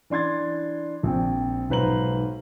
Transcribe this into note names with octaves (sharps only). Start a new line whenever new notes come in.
E3 D4 C6 G#6 A6
A#1 C4 G5
B1 G#2 B4 C5 A#5 F#7